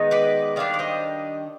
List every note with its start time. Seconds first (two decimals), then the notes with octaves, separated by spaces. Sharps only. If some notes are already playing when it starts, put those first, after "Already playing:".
Already playing: D#3 G#3 B3 D#4
0.11 B4 D5
0.56 D#3 G3 D4 D5 F5
0.74 D5
0.79 C5 D#5